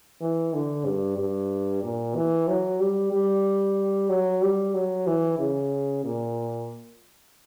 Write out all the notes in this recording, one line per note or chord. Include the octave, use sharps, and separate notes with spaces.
E3
D3
G2
G2
A#2
E3
F#3
G3
G3
F#3
G3
F#3
E3
C#3
A#2